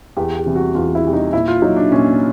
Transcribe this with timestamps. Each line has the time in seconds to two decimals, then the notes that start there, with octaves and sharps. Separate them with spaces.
0.17 E2 G4
0.37 G4
0.46 C3 E3 G3
0.56 F#4
0.75 E2 F4
0.95 E4
1.04 C3 E3 G3
1.13 D#4
1.33 A#2 E4
1.48 F4
1.62 F#3 D#4
1.77 D4
1.91 A#2 C#4